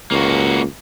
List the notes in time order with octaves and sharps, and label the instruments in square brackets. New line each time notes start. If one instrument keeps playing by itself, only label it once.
[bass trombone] C#2 [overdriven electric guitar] A#3 F#4